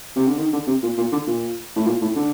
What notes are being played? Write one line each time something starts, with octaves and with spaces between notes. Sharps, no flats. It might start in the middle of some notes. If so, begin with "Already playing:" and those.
C3
D3
D#3
D3
C3
A#2
A#2
D3
A#2
A2
A#2
A2
D3